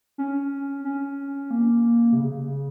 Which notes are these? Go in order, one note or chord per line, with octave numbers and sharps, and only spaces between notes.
C#4
C#4
A#3
C3
C#3